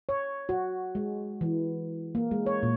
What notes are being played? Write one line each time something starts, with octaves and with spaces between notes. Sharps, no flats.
C#5
F#4
G#3
E3
A#3
G#3
C#5
A#2